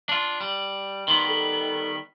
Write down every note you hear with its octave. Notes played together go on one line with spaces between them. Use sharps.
D4 F4
G3
D#3 G3 B3 C6
A4